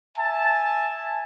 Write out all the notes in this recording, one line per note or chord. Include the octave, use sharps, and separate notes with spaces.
E5 G#5 A5